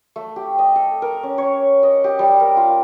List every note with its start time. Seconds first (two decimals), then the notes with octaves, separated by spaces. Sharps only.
0.16 A3
0.36 G4
0.59 D#5
0.76 A4
1.02 A#4
1.23 C#4
1.38 C#5
1.83 D#5
2.04 G4
2.19 G3
2.40 A#4
2.57 F4